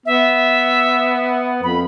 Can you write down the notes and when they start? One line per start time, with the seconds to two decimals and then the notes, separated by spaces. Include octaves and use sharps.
0.06 B3 E5
1.63 F2 B5